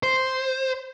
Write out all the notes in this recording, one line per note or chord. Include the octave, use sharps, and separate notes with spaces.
C5